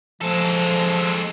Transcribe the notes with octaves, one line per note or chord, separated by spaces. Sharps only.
F3 G#3 A4